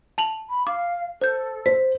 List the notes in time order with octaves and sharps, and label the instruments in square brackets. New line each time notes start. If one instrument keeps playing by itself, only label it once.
[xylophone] A5 F7 F#7
[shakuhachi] B5
[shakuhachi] F5 [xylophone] D6
[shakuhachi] A4 [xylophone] C5 G6
[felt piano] C5 [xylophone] B6